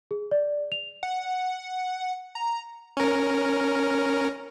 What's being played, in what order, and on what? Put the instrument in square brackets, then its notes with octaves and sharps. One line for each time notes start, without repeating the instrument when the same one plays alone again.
[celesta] G#4
D5
F7
[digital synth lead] F#5
A#5
[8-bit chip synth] C#4 A#4